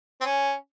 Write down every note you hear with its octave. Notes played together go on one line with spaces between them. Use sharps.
C4
C#4